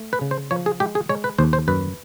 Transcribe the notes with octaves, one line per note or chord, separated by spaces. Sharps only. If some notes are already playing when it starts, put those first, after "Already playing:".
Already playing: A3
B4
C#3
C5
F3 C#5
G#4
G#3 G4
G#4
G#3 C#5
B4
D#2 C5
C5
F#2 B4